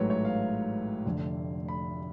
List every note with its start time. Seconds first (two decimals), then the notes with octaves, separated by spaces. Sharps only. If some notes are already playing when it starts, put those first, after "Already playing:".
Already playing: A1 G#2 F#3 A3 B4 C#5
0.10 C#5
0.25 F5
1.05 F1 F2 D3
1.68 B5